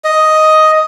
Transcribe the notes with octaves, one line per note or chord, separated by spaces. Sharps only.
D#5